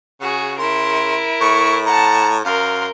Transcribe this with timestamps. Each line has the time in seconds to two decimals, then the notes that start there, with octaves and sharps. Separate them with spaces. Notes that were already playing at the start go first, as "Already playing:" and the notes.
0.21 C#3 F#4 G#4
0.59 E4 A#4 C6
1.41 A2 C#6
1.86 F#5 A5 A#5
2.45 F#2 A#4 F5 C6